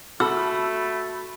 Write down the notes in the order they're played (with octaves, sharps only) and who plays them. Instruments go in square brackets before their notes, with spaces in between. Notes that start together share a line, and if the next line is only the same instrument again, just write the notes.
[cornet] A3 [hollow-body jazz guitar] F#4 A4 [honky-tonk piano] B5 [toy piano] E6